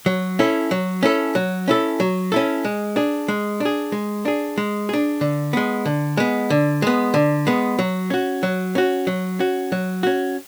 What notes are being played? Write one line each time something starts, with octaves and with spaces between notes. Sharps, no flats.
F#3
C#4 E4 A4
F#3
C#4 E4 A4
F#3
C#4 E4 A4
F#3
C#4 E4 A4
G#3
D4 G#4
G#3
D4
G#4
G#3
D4 G#4
G#3
D4 G#4
D3
G#3 B3
D3
G#3 B3
D3
G#3 B3
D3
G#3 B3
F#3
C#4 F#4
F#3
C#4 F#4
F#3
C#4 F#4
F#3
C#4 F#4